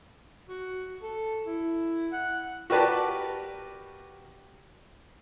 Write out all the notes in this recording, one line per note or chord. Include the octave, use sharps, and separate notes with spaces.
F#4
A4
E4
F#5
F#4 G4 A#4 B4 D5 A5